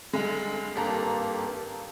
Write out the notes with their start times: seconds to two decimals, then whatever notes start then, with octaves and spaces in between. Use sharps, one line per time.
0.13 D2 G2 G#3
0.75 G#1 G2 A#3 G4 A4 A#5